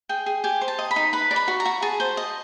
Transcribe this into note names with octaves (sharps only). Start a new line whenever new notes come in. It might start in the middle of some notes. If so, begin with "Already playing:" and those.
G#4 G5
G#4
G4 G#5
C5
A5
D#5
B5
D#4
B4 B5
D5
B5
F#4
A#5
F#4
G#4 A5
C5
D#5